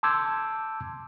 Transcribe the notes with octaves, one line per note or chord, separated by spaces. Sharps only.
A5 C6 D6 E6 G6 G#6